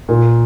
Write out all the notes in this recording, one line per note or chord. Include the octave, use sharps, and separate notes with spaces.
A#2